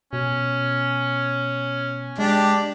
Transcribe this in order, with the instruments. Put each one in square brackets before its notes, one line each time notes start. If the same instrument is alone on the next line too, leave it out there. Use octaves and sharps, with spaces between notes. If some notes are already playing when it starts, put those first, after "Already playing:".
[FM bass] B2 [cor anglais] C#4
[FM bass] G#3 [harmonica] D4 G4